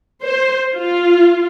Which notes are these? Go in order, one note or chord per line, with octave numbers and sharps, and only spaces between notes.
C5
F4